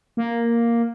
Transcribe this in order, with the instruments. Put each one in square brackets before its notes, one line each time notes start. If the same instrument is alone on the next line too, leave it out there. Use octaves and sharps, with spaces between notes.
[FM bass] A#3